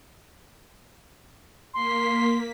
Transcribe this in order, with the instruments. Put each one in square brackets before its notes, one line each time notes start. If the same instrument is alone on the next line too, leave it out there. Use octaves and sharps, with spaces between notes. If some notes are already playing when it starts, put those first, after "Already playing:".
[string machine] A#3 B6 [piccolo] C6